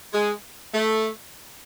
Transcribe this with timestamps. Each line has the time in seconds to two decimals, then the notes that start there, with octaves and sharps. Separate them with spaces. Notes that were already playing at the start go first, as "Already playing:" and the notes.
0.13 G#3
0.73 A3